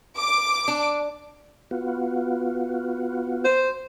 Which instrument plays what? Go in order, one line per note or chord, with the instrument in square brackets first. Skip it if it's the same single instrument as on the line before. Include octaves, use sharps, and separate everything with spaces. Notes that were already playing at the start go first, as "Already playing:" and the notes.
[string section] D6
[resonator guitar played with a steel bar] D4
[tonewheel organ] B3 F4 F#4
[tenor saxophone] C5